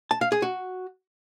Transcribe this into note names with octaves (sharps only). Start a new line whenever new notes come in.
A5
F5
G#4
F#4